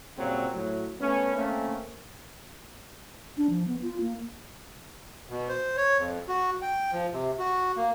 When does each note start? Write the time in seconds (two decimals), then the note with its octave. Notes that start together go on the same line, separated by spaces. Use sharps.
0.17 A#2 C#3 F#3 G3 C4
0.54 A2 F#3
1.00 A3 B3 C#4
1.36 A3 A#3 C4 C#4
3.38 D4
3.50 F3
3.68 B3
3.82 F4
4.00 A#3
5.30 B2
5.49 C5
5.77 C#5
5.98 F2
6.28 F#4
6.62 G5
6.92 F3
7.13 C3
7.39 F#4
7.77 A#3